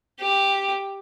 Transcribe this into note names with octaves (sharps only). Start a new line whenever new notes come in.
G4